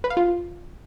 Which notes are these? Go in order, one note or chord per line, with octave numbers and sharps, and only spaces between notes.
B4
F5
F4